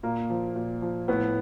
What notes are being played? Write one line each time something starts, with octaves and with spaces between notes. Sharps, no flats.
A#2 A#3
F3
A#2
F3
A2 B3